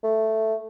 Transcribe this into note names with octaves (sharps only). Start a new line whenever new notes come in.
A3